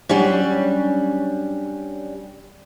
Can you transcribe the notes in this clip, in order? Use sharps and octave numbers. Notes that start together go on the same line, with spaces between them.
F#3 G3 C#4 D4